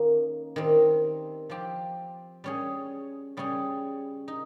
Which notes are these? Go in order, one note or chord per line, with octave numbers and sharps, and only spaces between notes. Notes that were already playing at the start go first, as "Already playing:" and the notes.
Already playing: D#3 A#3 C#4
D#3 G3 C4
F3 C4 G4
G3 C#4 G#4
C#3 G3 C#4 G#4
D#4